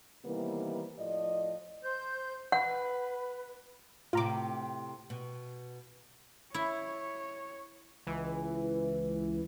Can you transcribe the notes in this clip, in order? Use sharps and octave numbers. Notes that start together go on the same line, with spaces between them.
C3 D#3 E3 G3 A#3 B3
A2 F3 D5 D#5
C5 G6
B4 F#5
A2 C3 F4 A#5 D6
B2
E4 C#5
C#2 E3